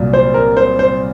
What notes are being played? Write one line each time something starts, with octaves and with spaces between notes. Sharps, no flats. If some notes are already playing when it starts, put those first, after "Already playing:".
Already playing: C2 A#2 F#3
C5
A#4
C5
C5